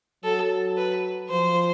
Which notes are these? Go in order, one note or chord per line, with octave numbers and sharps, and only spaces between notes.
F#3 A4
B4
F3 C5